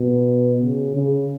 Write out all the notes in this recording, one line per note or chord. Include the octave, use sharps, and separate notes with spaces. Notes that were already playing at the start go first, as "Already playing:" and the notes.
Already playing: B2
C#3
C#3